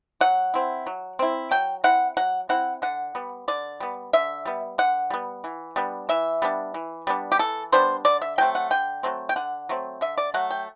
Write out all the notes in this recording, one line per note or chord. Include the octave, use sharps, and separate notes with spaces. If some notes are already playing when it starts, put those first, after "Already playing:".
F#3 F#5
C4 E4
F#3
C4 E4
F#3 G5
C4 E4 F#5
F#3 F#5
C4 E4 F#5
D3 F#5
G3 B3
D3 D5
G3 B3
D3 E5
G3 B3
D3 F#5
G3 B3
E3
G3 B3 D4
E3 E5
G3 B3 D4
E3
G3 B3 D4
G4
E3 A4
G3 B3 D4 C5
D3 D5
E5
F#3 A3 C4 G5
F#5
D3 G5
F#3 A3 C4
G5
D3 F#5
F#3 A3 C4
D3 E5
D5
F#3 A3 F#5
G5